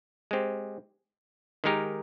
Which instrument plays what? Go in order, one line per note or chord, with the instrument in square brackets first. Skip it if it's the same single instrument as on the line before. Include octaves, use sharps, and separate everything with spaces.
[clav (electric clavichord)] G#3 C4 G4
D#3 G#3 D#4 G4 A#4